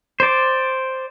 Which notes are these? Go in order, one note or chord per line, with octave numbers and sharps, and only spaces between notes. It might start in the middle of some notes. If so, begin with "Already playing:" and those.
C5 D5